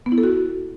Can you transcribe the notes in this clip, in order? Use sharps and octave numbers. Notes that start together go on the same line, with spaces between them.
B3
E4
A4
F#4